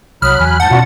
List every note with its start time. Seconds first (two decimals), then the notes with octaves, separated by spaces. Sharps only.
0.22 C2 F#3 B5 D#6 F6 F#6
0.39 E2 G#5
0.60 G#2 F#5 A5 G6
0.71 B2 C#4 D4 F4 F#4